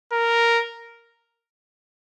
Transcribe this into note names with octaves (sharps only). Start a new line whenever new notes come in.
A#4